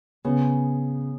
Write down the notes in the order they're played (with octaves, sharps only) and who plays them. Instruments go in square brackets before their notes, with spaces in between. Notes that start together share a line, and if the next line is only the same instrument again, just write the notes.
[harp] C#3 [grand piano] B3